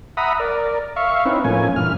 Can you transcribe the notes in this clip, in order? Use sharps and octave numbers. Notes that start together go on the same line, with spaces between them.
E5 F#5 A#5 B5 D#6
A#4 D5
E5 F5 C#6
C4 C#4 D#4 E4 B4
A2 F3 A#3 C#4 G#5
G2 A#2 E3 F6